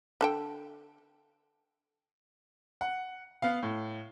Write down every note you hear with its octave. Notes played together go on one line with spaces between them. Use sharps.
D3 A4 G5
F#5
B3 F5
A2